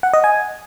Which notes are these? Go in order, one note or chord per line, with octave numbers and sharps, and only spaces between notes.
F#5
D#5
G#5